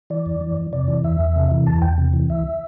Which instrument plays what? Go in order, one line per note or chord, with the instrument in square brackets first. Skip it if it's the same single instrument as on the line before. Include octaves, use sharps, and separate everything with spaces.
[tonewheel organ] E3 D5
F2
E3
F2
C3 D5
E3
E2 E5
E2
C3
E3
E2 A5
E2 G5
C3
E3
D2 E5